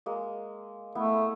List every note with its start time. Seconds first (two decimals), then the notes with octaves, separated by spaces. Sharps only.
0.06 G#3 A#3
0.95 A3 B3 E4